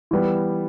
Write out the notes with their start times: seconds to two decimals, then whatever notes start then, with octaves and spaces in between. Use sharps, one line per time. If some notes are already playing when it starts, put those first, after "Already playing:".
0.11 E3 G3 B3